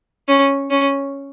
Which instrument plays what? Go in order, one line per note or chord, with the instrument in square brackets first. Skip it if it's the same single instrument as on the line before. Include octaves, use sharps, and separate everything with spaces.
[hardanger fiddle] C#4
C#4